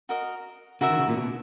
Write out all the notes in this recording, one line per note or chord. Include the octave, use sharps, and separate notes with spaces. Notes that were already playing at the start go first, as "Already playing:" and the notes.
F#4 A#4 D#5
C#3 F#4 A#4 E5
D#3
C#3
A#2
B2